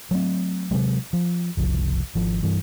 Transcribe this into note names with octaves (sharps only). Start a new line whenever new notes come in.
F#3 A3 C4
C3 F#3 G#3
F3
F#1 C2 F3
G#1 F3
G2 E3